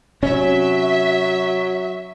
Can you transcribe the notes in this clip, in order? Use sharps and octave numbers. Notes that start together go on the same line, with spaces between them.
C3 F#3 C#4 E5